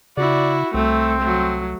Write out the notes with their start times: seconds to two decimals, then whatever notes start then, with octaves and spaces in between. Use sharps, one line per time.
0.17 C#3 E4 F#4 D5
0.74 C2 A3 C4
1.21 F#3 A3